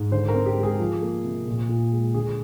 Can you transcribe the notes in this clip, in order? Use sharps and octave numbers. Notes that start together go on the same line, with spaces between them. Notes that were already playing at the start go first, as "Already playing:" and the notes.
Already playing: G#2
D3 C5
A#4
C4
G4
G#3
G#4
F3
A#3
C3
A#2
A#2
G#3
D3 G#4